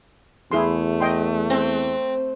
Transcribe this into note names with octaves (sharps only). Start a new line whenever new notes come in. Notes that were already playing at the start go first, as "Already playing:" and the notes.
E2 A3 E4 G#4 C6
D#5 G5 C6
C4